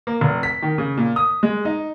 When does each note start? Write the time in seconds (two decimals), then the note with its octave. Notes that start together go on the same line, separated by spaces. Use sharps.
0.07 A#3
0.21 F1
0.43 B6
0.62 D#3
0.78 C#3
0.97 A#2
1.16 D#6
1.43 G#3
1.65 D#4